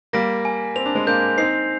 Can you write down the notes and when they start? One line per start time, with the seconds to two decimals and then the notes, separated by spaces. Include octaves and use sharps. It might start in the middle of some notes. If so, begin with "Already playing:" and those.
0.13 G3 A#3 A#6
0.45 G#5
0.76 C4 F7
0.86 D4
0.95 G#3 C4
1.07 A#3 D4 G6
1.38 C4 D#4 C7